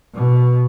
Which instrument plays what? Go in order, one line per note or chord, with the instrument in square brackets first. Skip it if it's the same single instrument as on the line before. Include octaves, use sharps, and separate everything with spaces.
[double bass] B2